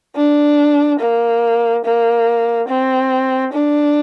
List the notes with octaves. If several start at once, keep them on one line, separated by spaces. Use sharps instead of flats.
D4
A#3
A#3
C4
D4